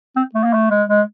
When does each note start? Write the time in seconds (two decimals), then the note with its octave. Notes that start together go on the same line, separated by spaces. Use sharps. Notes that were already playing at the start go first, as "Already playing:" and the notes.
0.16 C4
0.34 A3
0.44 A#3
0.53 A3
0.70 G#3
0.89 G#3